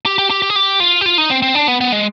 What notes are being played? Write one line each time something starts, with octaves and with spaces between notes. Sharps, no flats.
G4
G4
G4
G4
G#4
G4
F4
G4
F4
D#4
C4
C4
D4
B3
B3
G#3